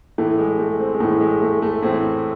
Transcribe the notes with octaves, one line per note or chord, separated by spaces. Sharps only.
A2 E3 A3
G#3
A3
C4
G#3
A2 E3 A3
G#3
A3
A3
A2 E3 C4